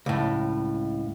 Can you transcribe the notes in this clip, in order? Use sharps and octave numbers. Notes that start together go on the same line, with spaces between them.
C#2 A2